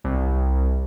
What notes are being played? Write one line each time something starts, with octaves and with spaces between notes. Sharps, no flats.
C2